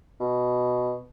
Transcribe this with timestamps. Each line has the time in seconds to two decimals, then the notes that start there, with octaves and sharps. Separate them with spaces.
0.20 B2